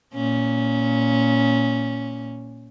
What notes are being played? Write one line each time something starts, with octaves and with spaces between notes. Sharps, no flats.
A#2 C#4